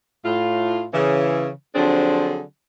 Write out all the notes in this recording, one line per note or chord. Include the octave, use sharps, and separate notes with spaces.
A2 F4
C#3 E3
D3 F3 F#3 C4 D4 G#4